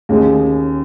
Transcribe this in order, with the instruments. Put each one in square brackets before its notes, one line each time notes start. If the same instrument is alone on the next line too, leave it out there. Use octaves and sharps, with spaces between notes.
[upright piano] D#2 C#3 G#3